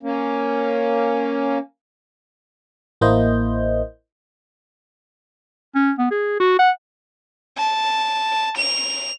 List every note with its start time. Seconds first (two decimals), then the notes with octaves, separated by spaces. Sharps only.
0.03 A#3 C#4
3.01 A1 A#3 E4 C5 D#5 G6
5.75 C#4
5.98 B3
6.11 G#4
6.40 F#4
6.59 F#5
7.57 A5
8.56 F7